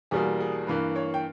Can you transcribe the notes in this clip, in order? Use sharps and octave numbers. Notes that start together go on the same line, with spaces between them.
E2 B2 G3 A#3 G#4
G#4
G2 E3 A#3 B4
C#5
G5